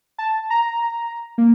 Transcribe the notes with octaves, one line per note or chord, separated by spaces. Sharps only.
A5
A#5
A#3